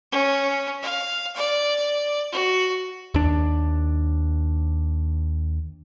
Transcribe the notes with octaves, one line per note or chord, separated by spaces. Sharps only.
C#4
F5
D5
F#4
D#2 D4